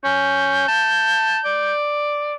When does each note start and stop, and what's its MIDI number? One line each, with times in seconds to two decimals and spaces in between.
0.04 0.68 61
0.04 1.73 91
0.68 1.39 81
1.45 2.35 74